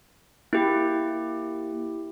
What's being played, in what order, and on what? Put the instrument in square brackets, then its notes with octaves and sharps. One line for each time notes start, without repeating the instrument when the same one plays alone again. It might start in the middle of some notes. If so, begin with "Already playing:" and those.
[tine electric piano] A#3 [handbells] E4 G4